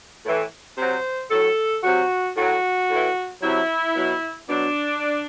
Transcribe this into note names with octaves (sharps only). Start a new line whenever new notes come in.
A2 E3
C3 F#3 C5
A2 F#3 A4
C3 F#3 F#4
A2 F#3 F#4
A2 E3
C3 F#3 E4
B2 F#3
B2 F#3 D4